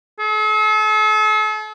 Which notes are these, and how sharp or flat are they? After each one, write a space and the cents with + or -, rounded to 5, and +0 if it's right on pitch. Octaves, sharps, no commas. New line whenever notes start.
A4 -45